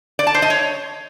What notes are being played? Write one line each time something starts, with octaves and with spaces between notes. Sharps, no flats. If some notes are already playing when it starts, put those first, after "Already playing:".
D5
A5
C5
D#5
C#5